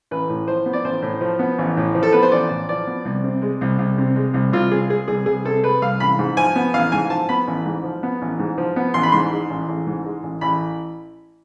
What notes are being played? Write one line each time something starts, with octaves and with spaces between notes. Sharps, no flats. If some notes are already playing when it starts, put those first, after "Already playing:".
A1 B4
A2
F3 C5
B3
D5
A1 C5
A2
F3
B3
A1
A2
F3
A4
B3 B4
C5
A1 D5
A2
F3 D5
B3
C2
C3
G#3
C2
C2
C3
G#3
C2
C2 F4
C3 G#4
G#3 G#4
C2 G#4
C2 G#4
C3 A4
G#3 B4
C2 F5
A1 B5
G#2
F3 G#5
B3
A1 F5
G#2 G#5
F3 A5
B3 B5
A1
G#2
F3
B3
A1
G#2
F3
B3
A1 C6
B5
G#2 C6
G#3
A1
A1
G#2
G#3
A1
A1 B5